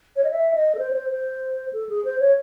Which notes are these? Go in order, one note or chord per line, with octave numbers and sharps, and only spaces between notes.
C#5
D#5
E5
D#5
A4
C5
C#5
C5
C5
A4
G#4
C5
C#5